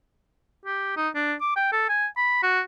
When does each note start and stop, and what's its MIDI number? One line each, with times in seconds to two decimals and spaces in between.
0.65 0.92 67
0.97 1.09 63
1.15 1.34 62
1.41 1.52 86
1.56 1.68 79
1.72 1.85 69
1.89 2.06 80
2.17 2.40 83
2.43 2.61 66